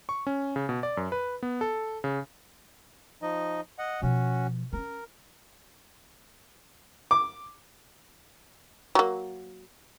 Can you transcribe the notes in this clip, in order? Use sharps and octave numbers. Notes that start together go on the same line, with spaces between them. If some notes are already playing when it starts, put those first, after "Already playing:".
C#6
C#4
C#3
B2
D5
F#2
B4
B3
A4
C#3
F3 D#4 D#5
D#5 F#5
B2 F3 C#4 F#4
C4 C#4 A#4
D6
F#3 A#3